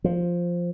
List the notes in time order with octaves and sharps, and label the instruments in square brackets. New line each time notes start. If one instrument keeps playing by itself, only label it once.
[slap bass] F3